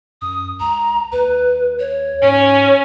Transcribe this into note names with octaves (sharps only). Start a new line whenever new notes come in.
F#2 D#6
C#2 A#5
D#2 B4
C#5
G#2 C#4